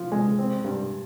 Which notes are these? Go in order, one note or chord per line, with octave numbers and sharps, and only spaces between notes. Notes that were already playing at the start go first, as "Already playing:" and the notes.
Already playing: F3
G#3
C4
G2